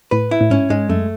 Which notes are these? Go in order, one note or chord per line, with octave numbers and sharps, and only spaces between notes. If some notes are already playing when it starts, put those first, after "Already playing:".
A2 B4
E4
A2
G#2 C#4
G#2 G#3
F#2 A3